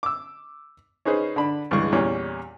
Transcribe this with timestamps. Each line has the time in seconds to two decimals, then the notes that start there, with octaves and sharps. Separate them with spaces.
0.03 D6 E6
1.05 C#4 D#4 G#4 B4 C5
1.36 D3 D4 B5
1.71 C#2 G2 C#3 E3 G#3 C#6
1.92 E2 A#2 G3 C#4